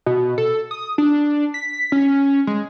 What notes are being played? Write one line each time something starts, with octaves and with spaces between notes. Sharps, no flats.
B2
A4
D#6
D4
B6
C#4
G#3